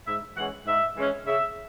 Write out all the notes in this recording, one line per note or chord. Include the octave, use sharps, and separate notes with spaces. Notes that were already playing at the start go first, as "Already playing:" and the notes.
G#2 E5
E3 G#3 C#4 F#5
G#2 E5
E3 G#3 C#4
C#3 E5